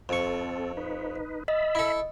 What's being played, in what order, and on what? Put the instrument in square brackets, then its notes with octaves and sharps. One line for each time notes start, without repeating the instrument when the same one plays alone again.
[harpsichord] F2 C#6 [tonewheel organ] C4 A4
[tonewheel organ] D#4 B4
[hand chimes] D#5 [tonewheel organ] E5 B5
[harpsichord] E4 A4